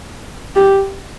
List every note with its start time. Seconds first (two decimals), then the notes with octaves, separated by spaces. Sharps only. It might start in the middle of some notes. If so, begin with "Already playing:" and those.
0.56 G4